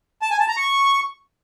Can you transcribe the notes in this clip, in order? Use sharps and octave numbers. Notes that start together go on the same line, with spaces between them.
A5
G#5
A5
A#5
C#6